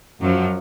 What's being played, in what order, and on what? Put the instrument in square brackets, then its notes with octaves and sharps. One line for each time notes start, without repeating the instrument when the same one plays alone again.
[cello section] F#2 F3 F#3